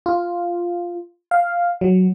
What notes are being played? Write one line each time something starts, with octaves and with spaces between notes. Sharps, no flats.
F4
F5
F#3